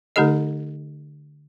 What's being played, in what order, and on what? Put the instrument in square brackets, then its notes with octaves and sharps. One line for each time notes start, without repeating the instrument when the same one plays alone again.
[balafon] D3 A3 D#4 G4 A4 D#5